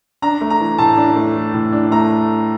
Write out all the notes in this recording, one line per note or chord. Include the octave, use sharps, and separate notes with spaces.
D4 A#5
A3
A#5
E3
A2 A5
D4
A3
E3
A2
D4
A3 A#5